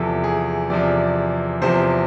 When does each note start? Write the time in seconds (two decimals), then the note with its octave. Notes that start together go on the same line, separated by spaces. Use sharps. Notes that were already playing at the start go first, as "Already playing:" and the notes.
Already playing: E2 C3 F3 A4
0.24 G#4
0.70 E2 C3 F3 D5
1.62 E2 C3 F3 C5